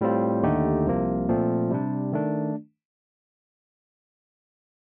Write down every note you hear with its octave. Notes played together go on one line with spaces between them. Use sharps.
A2 G3 C4 F4
D#2 D3 A3 D#4 G4
C2 C3 F3 A#3
A#2 F3 A3 C4
C3 G3 D4
D#3 A3 D4